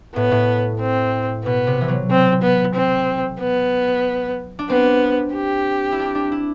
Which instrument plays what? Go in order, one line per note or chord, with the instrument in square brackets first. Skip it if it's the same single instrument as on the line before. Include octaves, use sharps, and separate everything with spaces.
[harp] A2 [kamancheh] B3
[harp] A2
[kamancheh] C4
[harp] B2 [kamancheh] B3
[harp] C3
E3
F#3
[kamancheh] C4
B3
C4
B3
[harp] D4
[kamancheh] B3 [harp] C4
[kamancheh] G4
[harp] E4
D4
D4
E4